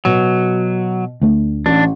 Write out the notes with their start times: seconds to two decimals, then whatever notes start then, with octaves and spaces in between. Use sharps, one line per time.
0.05 B2 F#3
1.22 D2 A3
1.66 A1 D4